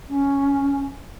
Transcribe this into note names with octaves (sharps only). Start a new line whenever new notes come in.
C#4